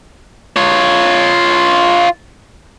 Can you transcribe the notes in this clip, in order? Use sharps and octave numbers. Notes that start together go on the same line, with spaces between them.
F4 C#5